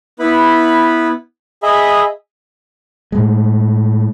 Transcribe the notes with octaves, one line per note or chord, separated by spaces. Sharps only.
B3 E4 B4 B5
G#4 D#5 E5 B5
A2 G#3